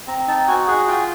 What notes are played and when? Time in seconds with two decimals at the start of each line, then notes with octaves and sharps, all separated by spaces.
0.07 C4 A#5
0.27 D#4 A5
0.48 F#4 G#5
0.67 G#4 F#5
0.87 F4 G5